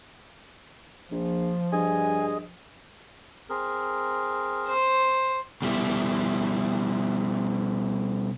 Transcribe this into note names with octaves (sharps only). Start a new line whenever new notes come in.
A#1 F3
G2 G#4 D#5 G#5
C4 G#4 A#4
C5
B2 G3 E4